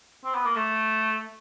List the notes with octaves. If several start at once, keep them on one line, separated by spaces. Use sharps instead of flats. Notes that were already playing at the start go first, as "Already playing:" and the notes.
C4
B3
A#3
A3